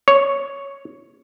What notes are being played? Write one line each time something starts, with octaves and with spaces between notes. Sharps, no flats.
C#5